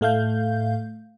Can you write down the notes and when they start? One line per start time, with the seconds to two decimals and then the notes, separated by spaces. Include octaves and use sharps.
0.01 A2 A3 F5 G6